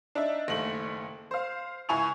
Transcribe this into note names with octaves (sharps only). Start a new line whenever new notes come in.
D4 D#4 E5
F#1 D#2 A3 F#7
C5 F5
C#2 E4 G#5 C#6 F7